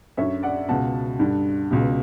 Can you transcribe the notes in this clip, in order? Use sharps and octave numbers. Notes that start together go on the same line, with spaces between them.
F#2 D3 C#5 E5
D5 F#5
C#2 B2 F#5 A5
G2 D3
C#2 B2